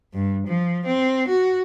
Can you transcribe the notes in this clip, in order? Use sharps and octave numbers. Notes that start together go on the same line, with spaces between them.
G2
F3
C4
F#4